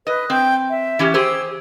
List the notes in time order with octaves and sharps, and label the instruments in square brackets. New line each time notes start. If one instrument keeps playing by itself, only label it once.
[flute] B4 [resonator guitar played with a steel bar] D#5
[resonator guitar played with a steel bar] C4 [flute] G5
[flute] E5
[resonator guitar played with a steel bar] E3 C#4 G4
[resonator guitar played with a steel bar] G4 G#4 C5 [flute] E6